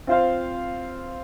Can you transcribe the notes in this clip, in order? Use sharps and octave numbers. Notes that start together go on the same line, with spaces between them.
C4 F4 C5 F5